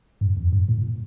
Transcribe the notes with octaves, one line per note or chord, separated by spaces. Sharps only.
G2
F2
G2
A#2